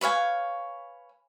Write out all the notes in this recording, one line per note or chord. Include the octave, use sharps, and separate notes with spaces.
B4 C#5 F5 G#5